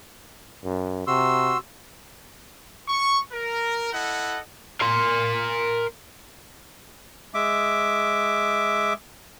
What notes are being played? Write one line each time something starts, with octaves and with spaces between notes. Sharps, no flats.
F#2
C3 F#4 C6 E6
C#6
A#4
E4 A4 D#5 F#5
A#4 C6
G#3 E5 D6